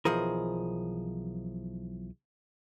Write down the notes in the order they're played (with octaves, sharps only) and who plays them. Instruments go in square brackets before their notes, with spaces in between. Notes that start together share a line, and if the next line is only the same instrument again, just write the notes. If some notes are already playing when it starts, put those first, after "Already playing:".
[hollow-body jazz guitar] B1 E3 F3 G#4 A#4